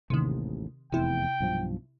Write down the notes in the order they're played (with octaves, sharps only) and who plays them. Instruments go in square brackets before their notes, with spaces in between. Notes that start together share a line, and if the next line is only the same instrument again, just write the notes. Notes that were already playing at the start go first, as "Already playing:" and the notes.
[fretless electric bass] A1 D#2 G#2 [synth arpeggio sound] C3 D#3
[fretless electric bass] F1 E2 [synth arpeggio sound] C3 E4 [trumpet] G5
[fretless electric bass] B1 G2 F3